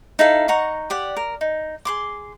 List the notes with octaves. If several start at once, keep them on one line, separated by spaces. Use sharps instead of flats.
D#4 E4 A4 F5
D#4 F#5 A#5 C#6
G4 D5 F#5
A#4
D#4
G#4 C6 D6